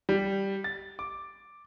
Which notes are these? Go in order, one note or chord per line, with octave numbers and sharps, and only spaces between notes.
G3
A6
D6